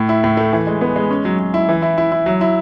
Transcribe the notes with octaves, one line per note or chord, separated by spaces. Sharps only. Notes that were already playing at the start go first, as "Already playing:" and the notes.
Already playing: A2
E4
A2
A3
E3
G#3
B3
G#3
C#4
F#3
F#3
E4
E3
E4
E4
E4
F#3
E4